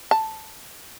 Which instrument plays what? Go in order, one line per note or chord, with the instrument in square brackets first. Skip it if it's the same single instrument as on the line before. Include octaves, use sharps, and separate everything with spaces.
[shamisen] A5